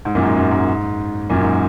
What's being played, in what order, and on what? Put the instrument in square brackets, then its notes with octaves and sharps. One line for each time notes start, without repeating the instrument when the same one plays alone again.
[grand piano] G#2
F#2 A#2
G#2
F#2
G#2
F#2 A#2
G#2